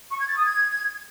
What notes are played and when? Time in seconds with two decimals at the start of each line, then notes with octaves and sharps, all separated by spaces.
0.11 C#6
0.19 G#6
0.28 A6
0.36 D#6
0.45 G#6